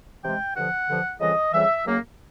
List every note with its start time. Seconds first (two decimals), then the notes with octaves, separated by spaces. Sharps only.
0.23 C3 E3 G#3 G5
0.55 G2 D3 F3 F#5
0.88 G2 D3 F3
1.20 F2 C#3 E3 G3 D#5
1.52 F2 C#3 E3 G3 E5
1.85 F#2 C#3 F#3 A#3